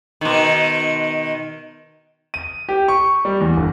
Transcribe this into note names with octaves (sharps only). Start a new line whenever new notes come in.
B2 D#3
D#7
G4
C#6
G3
E2
G1